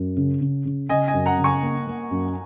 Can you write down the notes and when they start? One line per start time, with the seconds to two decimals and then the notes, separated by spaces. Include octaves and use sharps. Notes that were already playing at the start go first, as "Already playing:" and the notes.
Already playing: F#2
0.17 C#3
0.41 C#3
0.65 C#3
0.89 C#3 D#5 G#5
1.08 D#5 G#5
1.14 F#2
1.26 F#5 A#5
1.38 C#3
1.44 G#5 C#6
1.63 A#3
1.87 A#3
2.11 F#2